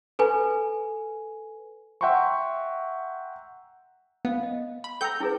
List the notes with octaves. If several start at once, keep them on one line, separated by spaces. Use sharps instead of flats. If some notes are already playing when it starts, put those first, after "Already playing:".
A4 B4 G#5
E5 F#5 G5 A#5 C6 C#6
B3 F5
D#5
B5
A4 G5 A#5 E6 G6
E4 G#4 B4